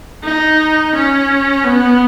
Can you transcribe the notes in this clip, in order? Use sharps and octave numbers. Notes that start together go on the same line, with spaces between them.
D#4
C#4
B3